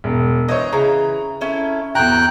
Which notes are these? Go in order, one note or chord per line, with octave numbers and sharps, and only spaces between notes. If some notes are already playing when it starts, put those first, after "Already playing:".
E1
E3 C5 C#5 D#5
C#3 E3 A#5
A3 C#4 E4
E2 A2 F#4 G5 A#5 F#6